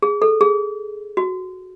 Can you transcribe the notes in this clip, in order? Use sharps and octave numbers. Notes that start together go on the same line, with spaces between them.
G#4
A4
G#4
F#4